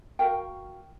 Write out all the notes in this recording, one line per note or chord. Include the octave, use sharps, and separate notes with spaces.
F#4 A#4 F5 G5